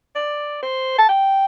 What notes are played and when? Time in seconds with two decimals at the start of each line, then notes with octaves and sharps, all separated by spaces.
0.16 D5
0.63 C5
0.98 A5
1.09 G5